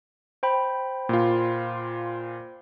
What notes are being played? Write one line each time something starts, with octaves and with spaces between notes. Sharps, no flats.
C5 G5 B5
A#2 F4